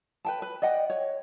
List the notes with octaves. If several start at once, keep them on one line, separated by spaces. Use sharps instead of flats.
B4 G5 A5
B4
D5 D#5 F#5 G5
C#5